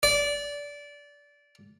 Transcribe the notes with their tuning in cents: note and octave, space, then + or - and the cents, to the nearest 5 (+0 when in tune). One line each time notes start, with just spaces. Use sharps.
D5 -20